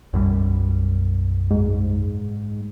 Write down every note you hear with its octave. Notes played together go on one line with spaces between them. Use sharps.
B1 F#2 G3
G#2